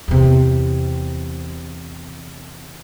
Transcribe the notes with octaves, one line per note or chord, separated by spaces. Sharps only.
E2 C3